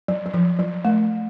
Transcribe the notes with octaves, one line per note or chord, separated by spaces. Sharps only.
F#3
F#3
F3
F#3
A3